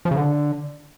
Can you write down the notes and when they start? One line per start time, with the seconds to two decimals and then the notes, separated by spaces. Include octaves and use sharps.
0.05 F3
0.11 C#3
0.17 D3